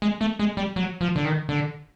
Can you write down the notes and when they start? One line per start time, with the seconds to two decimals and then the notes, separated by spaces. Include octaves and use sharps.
0.02 G#3
0.21 A3
0.39 G#3
0.57 G3
0.76 F#3
1.01 F3
1.16 D3
1.25 D#3
1.49 D3